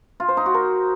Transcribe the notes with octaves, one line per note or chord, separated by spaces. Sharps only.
F4
C5
D#4
F#4
A#4